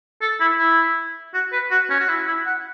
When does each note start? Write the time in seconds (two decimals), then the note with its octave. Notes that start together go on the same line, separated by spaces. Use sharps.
0.21 A4
0.40 E4
0.58 E4
1.34 F#4
1.52 B4
1.71 F#4
1.90 C#4
2.00 F#4
2.09 E4
2.27 E4
2.46 F#5